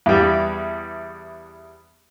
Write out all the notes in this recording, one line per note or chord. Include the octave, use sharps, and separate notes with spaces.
E2 G3